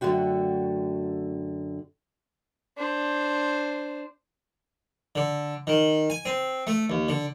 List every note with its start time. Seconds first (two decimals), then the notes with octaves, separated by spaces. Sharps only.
0.01 F#2 D3 A3 F#4 G5
2.78 D4 C5
5.15 D3
5.67 D#3
6.10 G#5
6.25 C4
6.67 A3
6.90 D#2
7.09 D3